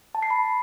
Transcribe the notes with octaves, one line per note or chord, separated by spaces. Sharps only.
A5
C7
B5